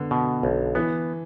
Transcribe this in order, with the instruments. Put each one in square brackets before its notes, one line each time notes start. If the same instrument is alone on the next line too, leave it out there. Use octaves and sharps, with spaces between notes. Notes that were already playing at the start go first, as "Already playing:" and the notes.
Already playing: [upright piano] D3 B3
[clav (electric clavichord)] B2
B1
[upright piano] E3 [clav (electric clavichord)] B3